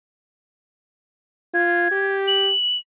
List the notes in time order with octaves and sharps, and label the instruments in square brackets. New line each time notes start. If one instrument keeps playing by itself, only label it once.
[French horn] F4 [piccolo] G#6
[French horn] G4
[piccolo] F#7